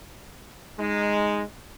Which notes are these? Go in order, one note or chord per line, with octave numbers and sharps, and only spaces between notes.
G#3 D#4